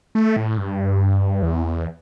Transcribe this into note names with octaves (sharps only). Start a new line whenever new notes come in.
A3
A2
G2
E2